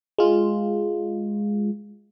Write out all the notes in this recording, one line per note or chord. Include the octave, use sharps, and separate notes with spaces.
G#3 F4